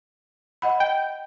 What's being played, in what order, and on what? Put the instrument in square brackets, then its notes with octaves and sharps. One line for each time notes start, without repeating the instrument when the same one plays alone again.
[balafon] D#5 F#5 B5
[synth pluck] G5